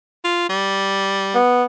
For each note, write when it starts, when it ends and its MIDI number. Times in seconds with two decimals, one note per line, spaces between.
0.24 0.48 65
0.49 1.37 55
1.35 1.64 59